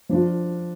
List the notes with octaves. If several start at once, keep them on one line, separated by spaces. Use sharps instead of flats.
F3 D4 F4